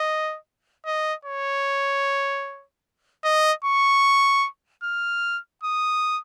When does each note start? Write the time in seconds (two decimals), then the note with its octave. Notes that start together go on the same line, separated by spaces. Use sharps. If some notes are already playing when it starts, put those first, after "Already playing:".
Already playing: D#5
0.86 D#5
1.25 C#5
3.25 D#5
3.65 C#6
4.83 F6
5.63 D#6